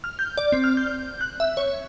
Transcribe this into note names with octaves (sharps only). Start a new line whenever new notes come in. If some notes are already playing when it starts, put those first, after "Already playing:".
F6
G6
D5
C4
F6
G6
F#6
E5
C#5